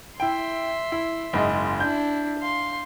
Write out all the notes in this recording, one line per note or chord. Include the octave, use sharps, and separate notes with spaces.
E4 E5 G5 C6
E4
F#1 G#2 D#5
D4 E4 G6
F5 C6